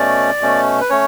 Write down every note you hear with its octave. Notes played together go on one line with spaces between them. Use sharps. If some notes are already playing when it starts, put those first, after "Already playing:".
Already playing: B2 A3 C#4 D5
B2 A3 C#4
B4
A3 C#4 C#5